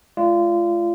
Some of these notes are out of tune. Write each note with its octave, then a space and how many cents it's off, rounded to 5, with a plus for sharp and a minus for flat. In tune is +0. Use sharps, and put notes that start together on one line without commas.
G#3 +45 F4 -25 D5 +0